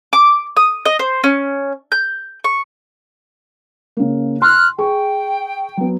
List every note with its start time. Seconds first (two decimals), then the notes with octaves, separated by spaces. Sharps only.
0.13 D6
0.57 D#6
0.85 D#5
0.99 C5
1.24 C#4
1.92 G6
2.44 C#6
3.97 C#3 A#3
4.42 C6 F6 F#6
4.78 G#4 G5 C#6
5.77 F#3 B3